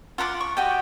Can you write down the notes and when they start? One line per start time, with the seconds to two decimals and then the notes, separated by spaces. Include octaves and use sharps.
0.18 F4 F#5 A#5 D6
0.41 C#6
0.57 F#4 G4 D#5 G5